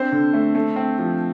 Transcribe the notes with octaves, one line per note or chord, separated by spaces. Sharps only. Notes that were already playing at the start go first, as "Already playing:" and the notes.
Already playing: C4 D4 C5
D3
A3
A3
C4
F3